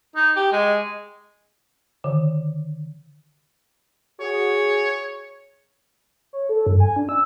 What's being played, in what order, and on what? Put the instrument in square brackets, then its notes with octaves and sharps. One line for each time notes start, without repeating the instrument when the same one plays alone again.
[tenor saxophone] D#4
G4
G#3
[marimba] D3 D#3
[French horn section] F#4 G#4 [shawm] C#5
[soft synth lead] C#5
A4
G2
G#5
D4
E6